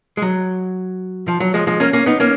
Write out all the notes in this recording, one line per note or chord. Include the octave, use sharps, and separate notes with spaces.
G#3
F#3
F3
F#3
F3 G#3
F3 G#3
A#3 C#4
A#3 C#4
B3 D#4
A#3 C#4